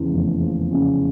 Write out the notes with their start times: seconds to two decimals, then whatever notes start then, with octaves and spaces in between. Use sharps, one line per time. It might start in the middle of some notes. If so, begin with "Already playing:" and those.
Already playing: E2 C#3 F3
0.12 F1
0.42 F3
0.71 C#3